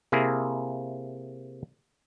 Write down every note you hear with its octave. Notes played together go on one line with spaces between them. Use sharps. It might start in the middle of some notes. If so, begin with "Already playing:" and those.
C3 A#3 E4 G#4